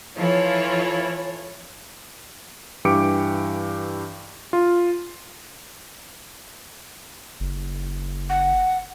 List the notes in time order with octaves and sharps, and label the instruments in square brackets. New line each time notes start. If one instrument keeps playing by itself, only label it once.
[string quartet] E3 E4 [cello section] F3 F4 A4 [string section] C#5
[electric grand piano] G2 E3 G4 D6 C#7 D7
F4
[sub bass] F#1
[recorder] F#5